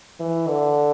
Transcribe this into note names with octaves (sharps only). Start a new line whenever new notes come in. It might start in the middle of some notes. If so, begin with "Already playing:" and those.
E3
D3